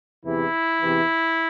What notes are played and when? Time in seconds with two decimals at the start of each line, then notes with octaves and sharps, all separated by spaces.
0.25 E2 C3 E3 E4
0.80 E2 C3 E3